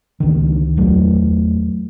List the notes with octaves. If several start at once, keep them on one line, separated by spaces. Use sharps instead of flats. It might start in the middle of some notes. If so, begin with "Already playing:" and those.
C#2 D#3
E2 F#3 A3